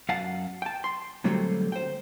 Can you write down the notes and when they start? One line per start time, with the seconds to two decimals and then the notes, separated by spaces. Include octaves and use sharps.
0.09 F#2 F5 F#5 A5
0.62 G5 A5
0.84 C6
1.24 A#2 D3 F#3 G3 A3 C4
1.72 C5 G5